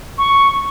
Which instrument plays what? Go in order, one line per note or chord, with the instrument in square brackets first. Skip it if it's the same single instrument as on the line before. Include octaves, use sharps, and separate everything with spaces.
[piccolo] C#6